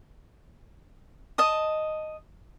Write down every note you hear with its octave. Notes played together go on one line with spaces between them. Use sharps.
D#5 A5 D#6